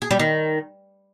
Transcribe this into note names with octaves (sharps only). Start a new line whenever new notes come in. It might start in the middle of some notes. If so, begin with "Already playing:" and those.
G#4
G3
D#3